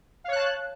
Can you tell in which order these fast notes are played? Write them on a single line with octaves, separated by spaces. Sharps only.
F5 C#5 F#6 A5